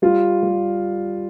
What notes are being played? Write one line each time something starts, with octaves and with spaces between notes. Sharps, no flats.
G3 F4
G3